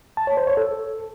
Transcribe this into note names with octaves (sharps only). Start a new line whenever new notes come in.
A5
C#5
C5
C#5
A4